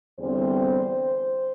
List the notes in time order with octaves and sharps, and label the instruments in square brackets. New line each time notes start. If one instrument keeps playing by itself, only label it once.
[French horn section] E2 D3 G3 C4 C5